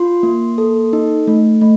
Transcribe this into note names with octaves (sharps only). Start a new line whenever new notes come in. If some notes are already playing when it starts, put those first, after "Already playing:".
Already playing: F4 C6
A#3
A4
D#4
A3
A3